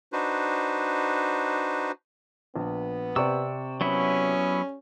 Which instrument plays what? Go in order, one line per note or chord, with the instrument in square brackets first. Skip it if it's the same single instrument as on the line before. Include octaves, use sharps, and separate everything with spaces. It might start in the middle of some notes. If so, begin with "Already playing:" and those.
[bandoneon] D4 D#4 F#4 B4 C5
[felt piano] A#1 [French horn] B3
[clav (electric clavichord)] C3 [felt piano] G4 D5 C#6 [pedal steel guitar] E6
[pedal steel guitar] F#3 B3 E4 [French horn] C#4